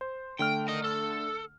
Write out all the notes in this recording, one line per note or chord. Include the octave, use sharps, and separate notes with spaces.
C5
D3 A3 G5 F6
A#4 D#5
A4